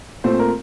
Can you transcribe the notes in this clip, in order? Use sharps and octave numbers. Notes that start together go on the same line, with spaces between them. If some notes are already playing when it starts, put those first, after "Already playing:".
A#2 A3 C4 C5
A#4